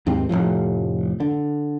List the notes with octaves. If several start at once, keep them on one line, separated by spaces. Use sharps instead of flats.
D#2 G#2 C4
F1 C#2 A2 F3
D3